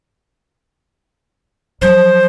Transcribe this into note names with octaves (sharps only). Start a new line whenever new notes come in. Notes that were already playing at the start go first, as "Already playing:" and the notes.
F3 F#3 C5